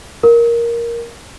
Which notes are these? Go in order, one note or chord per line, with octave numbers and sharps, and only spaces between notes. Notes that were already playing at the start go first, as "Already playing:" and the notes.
A#4